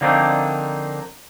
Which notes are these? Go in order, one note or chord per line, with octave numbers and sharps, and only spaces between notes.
D3 F3 A#3 C4 D4 D#4